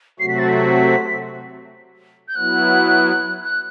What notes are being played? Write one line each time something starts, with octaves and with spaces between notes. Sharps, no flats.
C3 F#3 A3 C4 F#4 C7
B6
A6
B6
G6
F#3 B3 E4 F#6
F#6